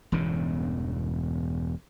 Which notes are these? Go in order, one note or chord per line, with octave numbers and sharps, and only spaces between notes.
E1 E2 G2 C#3